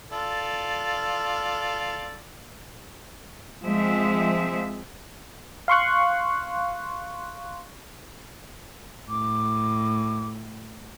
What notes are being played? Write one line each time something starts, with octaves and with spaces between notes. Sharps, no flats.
F4 A4 D5
F3 G#3 C4 E5
F5 C6 C#6 F#6
A2 D6